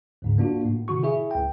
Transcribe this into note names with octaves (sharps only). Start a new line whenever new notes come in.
D2 G#2 C#3
A#3 D4 F4 F#4
A2
C3 D#3 F#4 C#6
E4 G#4 E5
C#2 G5